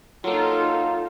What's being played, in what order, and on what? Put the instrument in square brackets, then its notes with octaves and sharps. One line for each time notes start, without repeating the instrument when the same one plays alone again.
[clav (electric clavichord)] F#3 A#3 [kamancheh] D#4 A4 [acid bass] F4